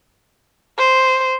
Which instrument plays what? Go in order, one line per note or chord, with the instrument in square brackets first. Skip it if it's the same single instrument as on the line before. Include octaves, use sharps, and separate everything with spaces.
[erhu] C5